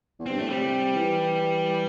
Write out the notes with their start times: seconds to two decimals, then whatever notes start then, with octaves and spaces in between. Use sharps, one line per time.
0.19 E2
0.26 G2 C4
0.38 A2 A3
0.50 C3 G3
0.95 E3